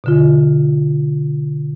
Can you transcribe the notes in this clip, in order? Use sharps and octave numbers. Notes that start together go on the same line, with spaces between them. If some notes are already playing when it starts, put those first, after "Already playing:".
B2 D3 F4